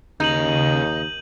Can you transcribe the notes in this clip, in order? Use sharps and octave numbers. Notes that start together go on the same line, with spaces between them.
D#2 C#3 D#4 G6 D#7 F#7